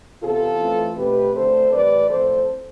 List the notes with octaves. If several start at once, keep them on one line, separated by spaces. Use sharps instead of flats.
C3 E3 B3 F4 A4
E3 A3 C4
B2 A3 C4 G4 B4
D3 A3 C4 A4 C5
A2 E3 G3 B4 D5
A2 F3 C4 A4 C5